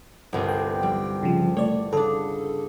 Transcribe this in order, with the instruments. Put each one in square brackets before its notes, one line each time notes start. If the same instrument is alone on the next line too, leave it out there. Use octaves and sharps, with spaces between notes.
[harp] G1 C2
[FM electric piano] G5
[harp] G3
[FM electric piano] C#3 F3
[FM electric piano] A3 D5 [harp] C#5
[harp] C#3 D4 [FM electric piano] A4